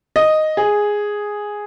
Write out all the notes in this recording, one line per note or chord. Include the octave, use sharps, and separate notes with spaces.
D#5
G#4